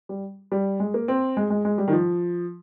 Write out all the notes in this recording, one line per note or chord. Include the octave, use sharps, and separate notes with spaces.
G3
G3
G#3
A#3
C4
G#3
G#3
G#3
G3
D#3
F3